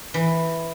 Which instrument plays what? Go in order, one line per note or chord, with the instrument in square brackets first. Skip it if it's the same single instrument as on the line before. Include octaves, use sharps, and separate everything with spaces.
[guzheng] E3